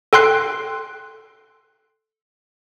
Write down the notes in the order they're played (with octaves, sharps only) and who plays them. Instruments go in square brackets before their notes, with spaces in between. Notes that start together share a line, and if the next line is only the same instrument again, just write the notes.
[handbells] A4 G5 C6 F#6 C7